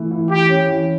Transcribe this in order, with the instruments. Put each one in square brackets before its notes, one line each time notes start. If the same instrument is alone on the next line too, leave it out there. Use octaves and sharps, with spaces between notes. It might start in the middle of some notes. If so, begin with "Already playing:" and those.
Already playing: [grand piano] E3 A3
E3
[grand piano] E3 [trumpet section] G4
[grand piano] C#4
E3